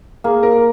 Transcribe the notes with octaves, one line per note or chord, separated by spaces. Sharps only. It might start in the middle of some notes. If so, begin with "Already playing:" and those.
A#3 G#4
A#4